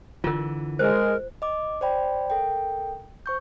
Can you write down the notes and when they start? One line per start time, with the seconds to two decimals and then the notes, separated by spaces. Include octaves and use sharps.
0.24 D3 E3 F4 A#4
0.79 G#3 A#4 C5
1.42 D#5 D6
1.81 C5 D5 G5 B5
2.30 A4 A#4 G5
3.26 C5 C#6 G6